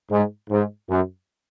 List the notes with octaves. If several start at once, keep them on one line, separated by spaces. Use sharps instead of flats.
G#2
G#2
F#2